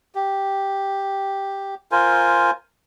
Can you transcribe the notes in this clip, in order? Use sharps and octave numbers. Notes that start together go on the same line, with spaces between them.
G4
F4 A#4 C5 G#5